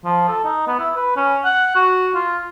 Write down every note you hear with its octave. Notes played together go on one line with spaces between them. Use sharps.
F3
A4
D#4
B3
E4
B4
C#4
F#5
F#4
F4